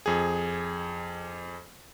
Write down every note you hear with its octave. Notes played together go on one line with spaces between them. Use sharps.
F2 G#4